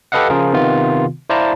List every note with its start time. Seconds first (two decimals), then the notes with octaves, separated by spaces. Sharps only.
0.12 G4 A4 B4 D#5 F5 F#5
0.30 C#3 F3 F4 G#4 A#4
0.53 C3 D#3 B3 F4
1.30 E4 C5 D5 F5 A5 A#5